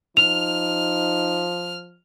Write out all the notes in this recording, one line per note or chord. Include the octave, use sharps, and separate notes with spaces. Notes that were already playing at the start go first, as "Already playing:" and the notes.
F3 D#4 F6 F7